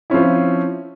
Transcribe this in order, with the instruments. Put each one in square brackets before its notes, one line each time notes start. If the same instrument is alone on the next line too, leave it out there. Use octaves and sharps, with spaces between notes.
[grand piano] F3 C4 C#4 E4